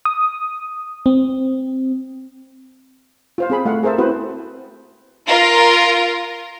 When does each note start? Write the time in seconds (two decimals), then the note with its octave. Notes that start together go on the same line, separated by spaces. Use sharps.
0.05 D#6
1.06 C4
3.38 F4 C5 F5
3.50 C4 G#4 B5
3.65 A3 F5 F#5
3.83 G#4 A#4 C5 E5 A5
3.98 C4 E4 F#4 B4 C5
5.27 F4 A#4